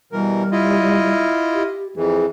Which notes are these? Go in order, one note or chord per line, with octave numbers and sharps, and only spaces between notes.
B2 E3 G3 A#4
E4 F4 D#5
G4
F2 E3 G#4